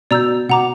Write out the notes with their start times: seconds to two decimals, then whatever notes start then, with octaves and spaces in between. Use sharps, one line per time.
0.11 B2 D5 A#5 E6 G6
0.49 B2 F#5 A#5 D6